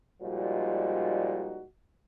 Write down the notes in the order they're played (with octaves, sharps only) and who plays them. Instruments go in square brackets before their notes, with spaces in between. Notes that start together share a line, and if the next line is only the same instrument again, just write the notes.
[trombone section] A#2 F3 G3 G#3 D#4 F#4